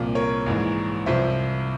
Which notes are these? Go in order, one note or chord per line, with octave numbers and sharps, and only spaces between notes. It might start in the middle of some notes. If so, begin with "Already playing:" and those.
Already playing: C2 A#2 F3
A#4 C#5
A#1 G#2 E3
C2 C3 F3 C5 E5